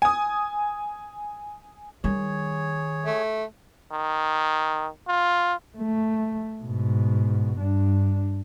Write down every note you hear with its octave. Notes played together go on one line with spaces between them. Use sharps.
G#5 D#6
D#3 G3 G#4 C#5
A3
D#3
F4
A3
G#2 B2
G2 D4